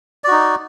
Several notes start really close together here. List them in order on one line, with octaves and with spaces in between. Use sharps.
D5 F#4 D#4